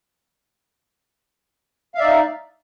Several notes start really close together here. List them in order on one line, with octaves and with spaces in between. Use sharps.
F5 E5 D5 D#4